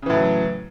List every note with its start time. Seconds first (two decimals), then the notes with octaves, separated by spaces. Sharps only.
0.02 C#3
0.06 E3
0.10 A2
0.13 F#3